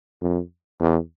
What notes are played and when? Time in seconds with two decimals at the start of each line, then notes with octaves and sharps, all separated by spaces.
0.22 F2
0.80 E2